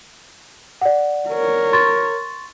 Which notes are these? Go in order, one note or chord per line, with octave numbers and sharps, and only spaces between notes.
D5 F#5
A#4 C#5
C6 C#6 A6